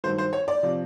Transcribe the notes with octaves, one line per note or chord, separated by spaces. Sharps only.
G2 D#3 F#3 C5
C5
C#5
D5
C3 F3